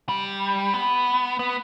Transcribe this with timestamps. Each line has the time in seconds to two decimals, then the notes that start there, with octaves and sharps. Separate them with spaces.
0.09 G3
0.74 B3
1.39 B3